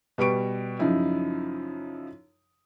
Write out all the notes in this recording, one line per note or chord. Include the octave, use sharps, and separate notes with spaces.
B2 G3 B4 C#6 D7
F#2 C#3 F3 D#4 E4